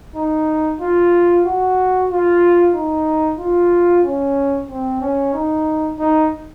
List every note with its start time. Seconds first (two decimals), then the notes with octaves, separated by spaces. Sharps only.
0.16 D#4
0.81 F4
1.46 F#4
2.11 F4
2.75 D#4
3.39 F4
4.04 C#4
4.69 C4
5.01 C#4
5.34 D#4
5.99 D#4